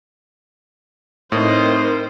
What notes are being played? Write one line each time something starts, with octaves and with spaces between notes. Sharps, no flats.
A2 C4 D#4 A#4 C5 D#5